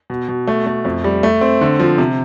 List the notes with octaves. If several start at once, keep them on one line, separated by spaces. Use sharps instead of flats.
B2
B2
A3
A3
F2
G3
A3
C4
D3
F3
C3